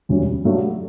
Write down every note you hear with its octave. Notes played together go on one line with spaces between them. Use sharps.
E1 D2 D3 G3 C#4
G2 F#3 A3 D4